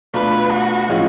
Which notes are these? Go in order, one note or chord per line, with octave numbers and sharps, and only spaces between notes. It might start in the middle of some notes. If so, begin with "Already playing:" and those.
B2 A3 D4 F4 B4
F#4
A2 F3 G#3 C#4 F4